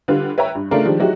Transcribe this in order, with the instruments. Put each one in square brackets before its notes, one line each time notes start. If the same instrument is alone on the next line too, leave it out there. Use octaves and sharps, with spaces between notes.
[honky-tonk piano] D3 G3 F4 B4
B4 C#5 E5 G5 A#5
G2
C#3 A3 D4 F4 A#4
D#3 F3 G3 G#3 D4
F#3 G#3 D#4 E4 F#4 G4